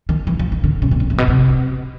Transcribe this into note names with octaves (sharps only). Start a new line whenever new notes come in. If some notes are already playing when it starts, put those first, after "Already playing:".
D#3
E3
F3
D#3
D3
C#3
B2
A#2
A2
B2
C3